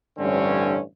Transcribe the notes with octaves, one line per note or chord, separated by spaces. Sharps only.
A1 G2 D3 C4 C#4